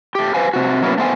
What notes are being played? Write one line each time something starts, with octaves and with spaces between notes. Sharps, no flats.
A3 G4
B4 C5 F5 G#5
C3 F#4
F#3 A#3 B3 C#4 E4
A3 B3 C5 F5 G#5